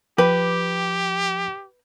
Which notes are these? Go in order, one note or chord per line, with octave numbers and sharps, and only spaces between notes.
F3 G4 B4 G5 D6